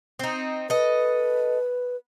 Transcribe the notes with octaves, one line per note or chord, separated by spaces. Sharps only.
C4 D#4
A4 B4 D#5